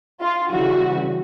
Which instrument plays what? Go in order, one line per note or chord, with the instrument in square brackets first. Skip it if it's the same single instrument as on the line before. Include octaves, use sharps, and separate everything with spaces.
[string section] F4
C#3 E3 G3 F#4